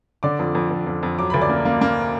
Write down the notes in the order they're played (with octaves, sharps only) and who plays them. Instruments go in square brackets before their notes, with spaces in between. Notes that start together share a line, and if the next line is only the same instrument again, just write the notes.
[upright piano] D3 D5 D6
F2
F2
F2
F2
F2
F#3 D6
D2 B5
D5 D6
A#3
A#3
A#3